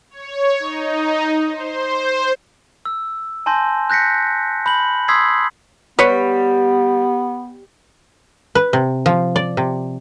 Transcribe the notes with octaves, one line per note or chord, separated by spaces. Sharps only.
C#5
D#4
C5
E6
G#5 A5 C6 G6 A#6
F#6 G6 A#6 B6 C#7
B5 G6 F#7
C6 D#6 E6 G#6 B6 C7
G3 B3 B4 C#5
B4
C3
F3
D5
C3